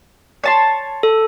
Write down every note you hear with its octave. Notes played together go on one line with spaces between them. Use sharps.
C#5 A5 C6
A4